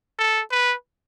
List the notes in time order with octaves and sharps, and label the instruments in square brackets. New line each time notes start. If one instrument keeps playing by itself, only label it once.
[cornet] A4
B4